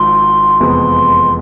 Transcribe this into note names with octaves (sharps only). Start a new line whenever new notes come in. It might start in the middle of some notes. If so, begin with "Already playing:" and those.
Already playing: G#1 G#2 F3 C6
F1 E2 C3 G#3 B3